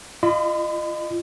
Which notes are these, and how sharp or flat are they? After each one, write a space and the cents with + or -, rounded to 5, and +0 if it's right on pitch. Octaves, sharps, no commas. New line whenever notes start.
F4 -30 D#5 -30 B5 +35